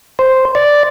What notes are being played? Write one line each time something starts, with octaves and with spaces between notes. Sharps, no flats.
C5
D5